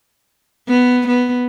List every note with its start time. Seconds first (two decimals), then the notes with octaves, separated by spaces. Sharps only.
0.68 B3
1.08 B3